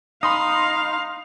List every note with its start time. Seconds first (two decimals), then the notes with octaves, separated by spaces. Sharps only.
0.23 D#4 F5 B5 C6 D#6